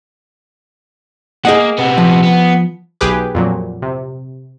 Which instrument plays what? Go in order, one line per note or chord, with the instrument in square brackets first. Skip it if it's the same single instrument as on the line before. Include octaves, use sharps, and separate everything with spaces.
[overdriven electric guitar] A#3 [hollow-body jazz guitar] G#4 D#5 F#5
[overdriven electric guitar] C3 B3
[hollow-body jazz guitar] F3
[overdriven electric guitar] B3
[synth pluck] B1 G4 G#4 B4 D6
F2 A#2 F#3
C3